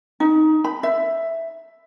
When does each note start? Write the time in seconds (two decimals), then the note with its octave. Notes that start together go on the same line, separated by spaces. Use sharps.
0.20 D#4
0.64 B5
0.83 E5